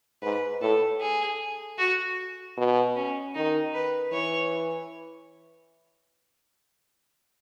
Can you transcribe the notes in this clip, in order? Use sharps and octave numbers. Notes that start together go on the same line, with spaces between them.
G#2 B4
A2 A4
G#4
F#4
B2
C#4
D#3 D#4
B4
E3 C#5